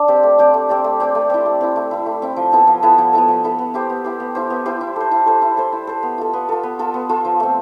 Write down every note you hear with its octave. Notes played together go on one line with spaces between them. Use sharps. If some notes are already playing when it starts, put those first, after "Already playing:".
Already playing: D4
C4 G4 D5
A3
C4 G4 D5
A3
C4 G4 D5
A3
C4 G4 D5
A3
C4 E4
A3
C4 E4
A3
C4 E4
A3
C4 E4
F3
B3 E4 A4
F3
B3 E4 A4
F3
B3 E4 A4
F3
B3 E4 A4
B3
E4 G4 C5
B3
E4 G4 C5
B3
E4 G4 C5
B3
E4 G4 C5
E4
A4 C5
E4
A4 C5
E4
A4 C5
E4
A4 C5
B3
F4 A4
B3
F4 A4
B3
F4 A4
B3
F4 A4
F3
A3 C4